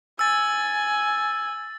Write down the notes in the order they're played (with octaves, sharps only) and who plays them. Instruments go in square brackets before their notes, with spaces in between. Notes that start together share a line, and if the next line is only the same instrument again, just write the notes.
[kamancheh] G#5 [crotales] E6 A6